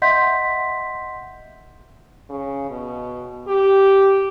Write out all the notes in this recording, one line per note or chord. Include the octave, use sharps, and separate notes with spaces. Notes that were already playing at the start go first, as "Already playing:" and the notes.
D#5 E5 F#5 C6 G6 B6
C#3
B2
G4